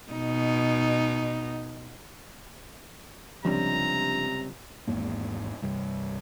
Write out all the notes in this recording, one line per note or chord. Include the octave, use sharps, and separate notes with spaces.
B2 D#4
C#2 C3 F3 G3 C4 D4 A#5
G#1 E2 G#2 A#3
C2 G2